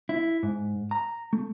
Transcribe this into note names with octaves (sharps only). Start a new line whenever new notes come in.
E4
G#2
A#5
A3